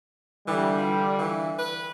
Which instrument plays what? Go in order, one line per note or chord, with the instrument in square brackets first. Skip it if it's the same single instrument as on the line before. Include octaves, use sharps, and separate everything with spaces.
[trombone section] D3 G3 [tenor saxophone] E3
[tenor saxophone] F4
E3
B4